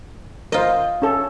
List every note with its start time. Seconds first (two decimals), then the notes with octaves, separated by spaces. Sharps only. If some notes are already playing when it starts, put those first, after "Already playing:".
0.52 F4 A#4 C5 D#5
1.02 C#4 A4